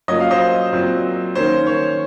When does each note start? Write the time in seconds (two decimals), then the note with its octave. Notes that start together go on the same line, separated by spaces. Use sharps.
0.08 A#2 F#3 A#3 C#4 D#5
0.20 F5
0.31 C5 D#5
0.72 A#2 F#3 C4
1.35 D#3 A#3 C#4 C5
1.67 C#5